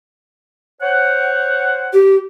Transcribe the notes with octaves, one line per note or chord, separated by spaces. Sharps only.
C5 C#5 F#5
G4